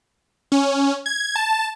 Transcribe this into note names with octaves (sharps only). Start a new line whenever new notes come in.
C#4
G#6
A5